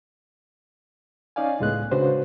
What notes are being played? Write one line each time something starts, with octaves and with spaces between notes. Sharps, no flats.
C#4 D#4 D5 F5 G#5
C#2 A2 G#3 B3 F#6
C#3 D4 F#4 B4 C5